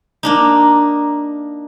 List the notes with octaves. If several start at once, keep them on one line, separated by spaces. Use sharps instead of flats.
A#3 D4 D#4